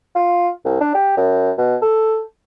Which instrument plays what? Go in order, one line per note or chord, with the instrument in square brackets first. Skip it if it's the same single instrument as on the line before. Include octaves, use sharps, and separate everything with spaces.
[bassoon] F4
C2
D4
G4
F#2
B2
A4